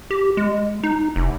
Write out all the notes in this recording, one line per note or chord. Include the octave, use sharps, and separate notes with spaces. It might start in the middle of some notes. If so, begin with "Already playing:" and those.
G4
G#3
D#4
F1